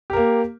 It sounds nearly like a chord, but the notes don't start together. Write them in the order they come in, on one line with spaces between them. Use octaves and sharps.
G4 A#4 A#3